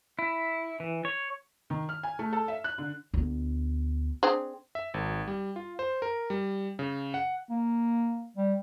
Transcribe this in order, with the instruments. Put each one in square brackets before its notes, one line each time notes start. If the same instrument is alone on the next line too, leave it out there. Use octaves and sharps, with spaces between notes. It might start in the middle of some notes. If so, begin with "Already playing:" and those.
[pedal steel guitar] E4
E3
C#5
[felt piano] D#3
F6
G#5
A3
A4
E5
F#6
D3
[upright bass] D2 B3
[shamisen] C4 D4 G#4
[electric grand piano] E5
G#1
G3
F4
C5
A#4
G3
C#3
F#5
[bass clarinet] A#3
G3